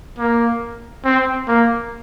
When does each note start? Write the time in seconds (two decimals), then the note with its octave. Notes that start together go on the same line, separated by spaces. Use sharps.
0.19 A#3
1.04 C4
1.48 A#3